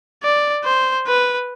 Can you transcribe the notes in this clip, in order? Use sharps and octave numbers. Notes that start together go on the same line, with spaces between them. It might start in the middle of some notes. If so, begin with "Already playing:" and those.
D5
C5
B4